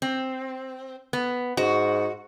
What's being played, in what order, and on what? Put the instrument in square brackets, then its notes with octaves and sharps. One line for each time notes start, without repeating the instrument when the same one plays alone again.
[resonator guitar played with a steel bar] C4
B3
[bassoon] G#2 [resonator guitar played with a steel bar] F#4